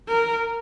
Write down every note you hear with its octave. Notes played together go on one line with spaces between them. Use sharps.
A#4